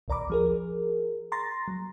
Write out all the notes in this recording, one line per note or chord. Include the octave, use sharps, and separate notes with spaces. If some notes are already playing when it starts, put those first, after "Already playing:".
A#1 D#2 D5 A#5 B5 D6
F3 G#4 A#4
A#5 C6 A6 A#6
F#3